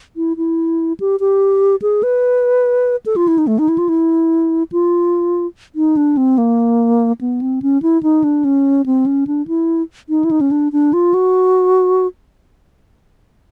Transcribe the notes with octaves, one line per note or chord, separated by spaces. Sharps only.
E4
E4
G4
G4
G#4
B4
A4
F4
E4
D#4
A3
D#4
E4
F4
E4
F4
D#4
D4
C4
A#3
B3
C4
C#4
E4
D#4
D4
C#4
C4
C#4
D4
E4
D#4
E4
D#4
C#4
D4
D4
F4
F#4